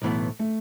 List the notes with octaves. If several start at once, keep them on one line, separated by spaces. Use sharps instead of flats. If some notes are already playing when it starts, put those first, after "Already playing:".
B1 A2 E3 B3
A3